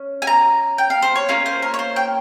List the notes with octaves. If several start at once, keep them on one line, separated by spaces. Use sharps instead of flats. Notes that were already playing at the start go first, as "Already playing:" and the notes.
Already playing: C#4
G#5
A#5
G5
F5
C5
C#5
A#3 C#4 F4
C5
A#4
C#5
C5
G5